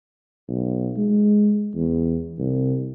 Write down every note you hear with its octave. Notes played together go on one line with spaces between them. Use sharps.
B1
G#3
E2
C2